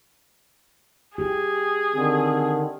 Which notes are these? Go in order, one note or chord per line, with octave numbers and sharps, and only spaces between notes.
G4 G#4
D3 D#3 C4